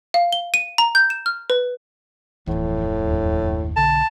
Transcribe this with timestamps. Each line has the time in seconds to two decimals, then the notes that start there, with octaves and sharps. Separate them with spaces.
0.14 F5
0.33 G7
0.54 D#7
0.78 A#5
0.95 G6
1.10 E7
1.26 F6
1.50 B4
2.47 D1 F2 A2 E3
3.07 F#1 D#2 D4
3.77 B1 D3 A5